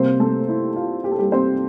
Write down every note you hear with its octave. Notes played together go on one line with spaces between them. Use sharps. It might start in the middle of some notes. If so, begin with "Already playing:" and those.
Already playing: C3 G3 A#3 C4 C5
A3 A4
E4
F4
G4
A4
G3 G4
C4 C5